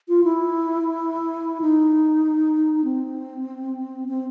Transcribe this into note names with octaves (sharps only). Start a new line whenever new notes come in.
F4
E4
D#4
C4
C4